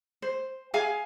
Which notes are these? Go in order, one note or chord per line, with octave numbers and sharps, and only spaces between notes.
C5
G#4 F5 G#5